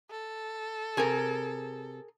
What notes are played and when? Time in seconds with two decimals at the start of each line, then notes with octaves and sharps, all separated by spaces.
0.11 A4
0.97 C3 G#4 A#4 G#5